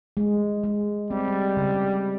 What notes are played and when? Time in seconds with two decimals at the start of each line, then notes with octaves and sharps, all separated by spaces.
0.17 G#3
0.63 G#3
1.11 G3 C4
1.57 C#3